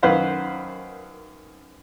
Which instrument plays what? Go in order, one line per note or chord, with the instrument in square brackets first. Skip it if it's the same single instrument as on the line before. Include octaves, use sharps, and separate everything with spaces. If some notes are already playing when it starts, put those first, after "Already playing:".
[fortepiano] F#2 D#3 B4 C5 F5 F#5